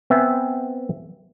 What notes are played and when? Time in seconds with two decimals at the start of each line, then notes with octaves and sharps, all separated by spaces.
0.10 B3 C4 E5 G#5